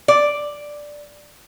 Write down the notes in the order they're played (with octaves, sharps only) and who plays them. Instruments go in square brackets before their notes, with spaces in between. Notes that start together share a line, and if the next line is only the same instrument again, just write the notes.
[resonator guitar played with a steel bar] D5